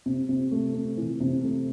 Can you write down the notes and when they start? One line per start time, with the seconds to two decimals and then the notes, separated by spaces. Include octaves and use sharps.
0.06 C3
0.29 C3
0.51 A3
0.74 C3
0.97 E3
1.20 C3
1.43 A3